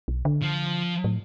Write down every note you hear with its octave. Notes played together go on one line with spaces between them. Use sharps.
B1
D3
F3
A2